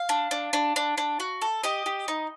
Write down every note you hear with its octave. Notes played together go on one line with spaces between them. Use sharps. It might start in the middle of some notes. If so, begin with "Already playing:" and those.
Already playing: F5
D4
D4
D4
D4
D4
F#4
A4
G4 D#5
G4
D#4